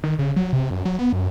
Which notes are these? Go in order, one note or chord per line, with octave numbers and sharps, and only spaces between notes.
D#3
C#3
F#3
C3
F#2
F#3
B3
F#2